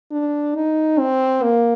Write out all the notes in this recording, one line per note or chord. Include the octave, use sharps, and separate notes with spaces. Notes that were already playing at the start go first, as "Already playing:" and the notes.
D4
D#4
C4
A#3